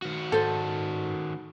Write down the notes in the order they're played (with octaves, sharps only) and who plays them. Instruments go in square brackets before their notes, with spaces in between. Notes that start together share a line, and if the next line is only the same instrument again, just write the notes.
[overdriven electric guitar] D#3 F#4
[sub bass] G#2 [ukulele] A4 C5